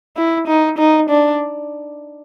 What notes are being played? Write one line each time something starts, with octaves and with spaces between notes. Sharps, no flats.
E4
D#4
D#4
D4